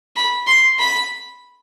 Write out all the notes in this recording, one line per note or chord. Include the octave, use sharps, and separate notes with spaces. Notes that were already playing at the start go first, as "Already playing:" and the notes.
B5
C6
B5